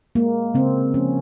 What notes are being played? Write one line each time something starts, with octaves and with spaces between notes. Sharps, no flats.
G#3 A#3
C#3 C4
F3 C#4